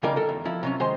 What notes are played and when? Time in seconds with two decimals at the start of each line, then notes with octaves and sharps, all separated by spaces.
0.03 C#3 G3 A#3 D#4 A#4 D5
0.16 A4 A#4
0.29 E2
0.45 F3 E4
0.63 C3 F#3 C#4
0.80 D#3 G#3 C5 C6